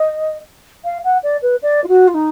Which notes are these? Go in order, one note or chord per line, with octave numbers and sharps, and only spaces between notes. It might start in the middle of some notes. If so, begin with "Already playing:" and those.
Already playing: D#5
F5
F#5
D5
B4
D5
F4
F#4
F4
D#4